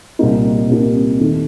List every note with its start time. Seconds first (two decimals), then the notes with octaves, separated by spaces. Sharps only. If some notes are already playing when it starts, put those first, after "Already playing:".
0.19 C2 A#2 G3 A#3 D#4
0.70 C2 A#2 G3 A#3 D#4
1.20 D#2 D#3 A3 D#4